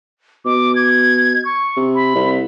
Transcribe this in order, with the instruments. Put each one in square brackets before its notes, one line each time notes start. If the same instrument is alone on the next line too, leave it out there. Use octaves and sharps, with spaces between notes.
[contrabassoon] B2 [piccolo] D6
[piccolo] G#6
C#6
[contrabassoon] C3
[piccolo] B5
[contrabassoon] C2